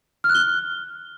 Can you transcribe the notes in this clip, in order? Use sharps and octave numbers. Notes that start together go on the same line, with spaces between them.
F6
F#6
G7